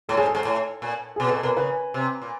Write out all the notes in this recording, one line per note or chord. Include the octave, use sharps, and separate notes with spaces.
A2 A4
G#2 G#4
A4
G#2
A2
A#2
B2 G#4
A#2 A4
B2 A#4
C#3 B4
C3
A#2